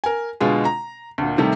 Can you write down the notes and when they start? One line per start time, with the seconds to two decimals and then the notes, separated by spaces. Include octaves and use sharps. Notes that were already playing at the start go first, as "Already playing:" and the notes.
0.04 A#4 G#5
0.40 B2 D3 G#3 F4 G#4
0.65 A#5
1.18 D2 A#2
1.38 C3 D#3 G3 A3